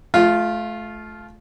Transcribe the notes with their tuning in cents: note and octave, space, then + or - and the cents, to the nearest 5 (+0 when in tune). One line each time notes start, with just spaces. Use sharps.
A3 -30 F4 +0